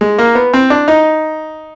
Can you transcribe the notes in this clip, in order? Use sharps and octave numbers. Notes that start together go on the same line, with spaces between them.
G#3
A#3
B3
C4
D4
D#4